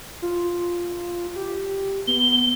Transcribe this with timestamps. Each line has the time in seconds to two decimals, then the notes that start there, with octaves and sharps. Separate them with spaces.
0.22 F4
1.36 G4
2.07 B3 G7